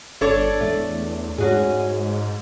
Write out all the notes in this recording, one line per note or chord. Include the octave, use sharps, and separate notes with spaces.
G1 D4 A4 C#5
E2 A3
G#2 C#4 F#4 G#4